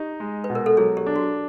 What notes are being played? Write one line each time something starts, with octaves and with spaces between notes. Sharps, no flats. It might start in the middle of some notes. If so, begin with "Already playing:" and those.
Already playing: D#4 G4
G#3
B4
B2
A#4
A4
F#3 G#4
G4
D4
F#4